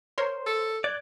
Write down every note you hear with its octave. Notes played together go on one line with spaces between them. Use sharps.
A#4 C5 C#5 C6
A4
D5 F#6 G#6